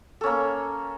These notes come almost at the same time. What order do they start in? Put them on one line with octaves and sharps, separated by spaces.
A4 C#4 A#3